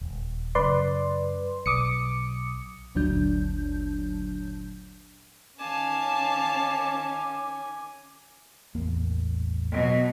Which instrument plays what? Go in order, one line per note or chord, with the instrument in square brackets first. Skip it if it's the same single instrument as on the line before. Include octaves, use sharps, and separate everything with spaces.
[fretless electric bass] D#1
[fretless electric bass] F#2 C#3 [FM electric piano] B4 D5 C6
[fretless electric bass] B1 [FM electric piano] D6 D#6 C#7
[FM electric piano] G1 D2 A#2 F#3 D4 G6
[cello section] D#3 C#4 [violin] F5 A5 [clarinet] G#5 [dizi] D6
[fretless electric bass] A1 E2 A#3
[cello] B2 F#3